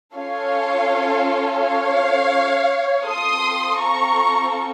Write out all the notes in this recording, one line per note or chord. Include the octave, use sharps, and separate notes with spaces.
C#4 F4 A4 C#5 F5
C#5 F5
C4 F4 A4 C6 D#6
A#5 C#6